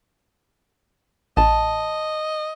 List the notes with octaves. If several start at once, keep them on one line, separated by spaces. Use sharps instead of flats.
A1 D#5 A5